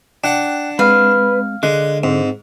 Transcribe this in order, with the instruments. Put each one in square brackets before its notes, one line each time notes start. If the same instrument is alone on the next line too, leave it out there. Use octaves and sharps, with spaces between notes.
[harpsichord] D4 F#5 [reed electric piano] G5 F#6
[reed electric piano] G#3 C4 [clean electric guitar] B4 [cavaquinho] F5
[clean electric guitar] D3 [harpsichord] G#3 [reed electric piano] F#6
[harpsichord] G#2 [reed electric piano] C4